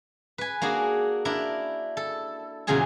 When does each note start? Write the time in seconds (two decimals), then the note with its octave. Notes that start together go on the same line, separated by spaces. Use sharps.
0.38 B4 G#5
0.62 A#3 D4 F#4 G#4
1.25 D4 E4 A#4
1.97 A4
2.67 E2 A#2 C#3 F#3 G#4 G#5